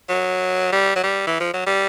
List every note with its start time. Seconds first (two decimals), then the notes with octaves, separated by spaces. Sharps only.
0.09 F#3
0.72 G3
0.96 F#3
1.04 G3
1.27 E3
1.40 F3
1.54 F#3
1.67 G3